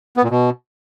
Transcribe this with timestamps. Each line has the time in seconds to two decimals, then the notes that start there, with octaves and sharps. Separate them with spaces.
0.17 B3
0.24 A#2
0.30 B2